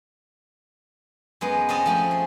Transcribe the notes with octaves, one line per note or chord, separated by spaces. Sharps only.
F#2 G#3 B3
C4 C#4 D#5 A5
F3 A3 D#5
G#4